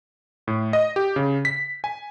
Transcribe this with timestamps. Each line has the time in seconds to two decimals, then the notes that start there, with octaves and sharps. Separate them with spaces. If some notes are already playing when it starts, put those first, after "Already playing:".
0.48 A2
0.73 D#5
0.96 G4
1.16 C#3
1.45 B6
1.84 G#5